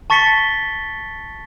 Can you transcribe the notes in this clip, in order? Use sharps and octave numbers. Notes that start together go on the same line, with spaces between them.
A5 C#6 A6 B6 C#7 G7